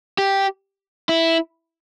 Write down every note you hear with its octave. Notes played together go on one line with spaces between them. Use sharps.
G4
E4